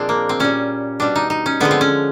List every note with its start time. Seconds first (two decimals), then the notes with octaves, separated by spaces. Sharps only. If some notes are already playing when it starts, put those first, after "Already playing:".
Already playing: A#2 F3 G#3 C4 D4
0.09 A#3
0.29 C4
0.40 A#2 G3 C#4
1.00 B2 G3 D4
1.16 D#4
1.30 D#4
1.46 C#4
1.60 D3 F3 G#3 B3
1.71 C4
1.81 C#4